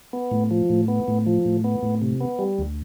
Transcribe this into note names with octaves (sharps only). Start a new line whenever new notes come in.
B3
A2
F3
A2
B3
A2
F3
A2
B3
A2
C3
B3
G3
D2